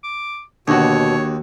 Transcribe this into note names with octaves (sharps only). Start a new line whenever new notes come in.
D6
D#2 B2 D3 F#4 C#5